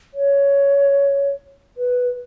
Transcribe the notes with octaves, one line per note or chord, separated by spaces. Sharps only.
C#5
B4